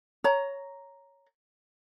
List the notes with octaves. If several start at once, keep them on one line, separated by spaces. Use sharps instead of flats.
C#5 A#5